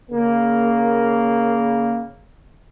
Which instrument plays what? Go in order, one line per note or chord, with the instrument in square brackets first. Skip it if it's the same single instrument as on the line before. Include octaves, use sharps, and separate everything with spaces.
[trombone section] C#3 A#3